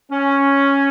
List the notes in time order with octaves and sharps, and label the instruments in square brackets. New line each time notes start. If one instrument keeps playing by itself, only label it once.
[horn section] C#4